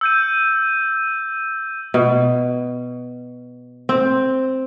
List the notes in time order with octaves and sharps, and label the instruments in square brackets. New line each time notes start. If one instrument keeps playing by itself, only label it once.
[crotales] E6 G6 D#7
[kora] B2
C4